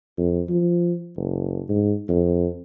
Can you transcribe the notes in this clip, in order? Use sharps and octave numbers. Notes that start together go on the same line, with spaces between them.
F2
F3
F#1
G#2
F2